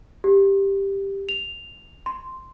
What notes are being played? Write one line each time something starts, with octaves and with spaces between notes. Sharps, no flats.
G4
F7
C6